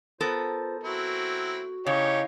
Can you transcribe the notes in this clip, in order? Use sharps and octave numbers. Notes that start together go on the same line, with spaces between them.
B3 F4 A4 A#4 C5
F#3 C4 E4 F#4
C#3 C#4 D#4 E4 G4 C#5 D#5 F5